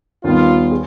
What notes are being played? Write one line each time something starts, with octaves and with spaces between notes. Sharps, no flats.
D#2 D#3 G3 B3 F4
G#4